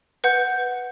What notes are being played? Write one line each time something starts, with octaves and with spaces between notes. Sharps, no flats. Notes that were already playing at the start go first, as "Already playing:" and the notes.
B4 F#5 G6